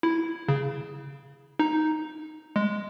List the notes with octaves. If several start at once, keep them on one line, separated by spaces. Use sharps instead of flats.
E4
C#3
D#4
G#3